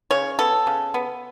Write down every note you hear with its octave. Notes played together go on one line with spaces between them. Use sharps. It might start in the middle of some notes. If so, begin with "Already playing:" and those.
C#3 C#5
B3 A4
C#3
B3